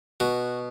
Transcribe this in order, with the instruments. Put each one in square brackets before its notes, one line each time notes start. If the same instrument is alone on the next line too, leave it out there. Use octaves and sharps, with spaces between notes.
[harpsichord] B2 F#4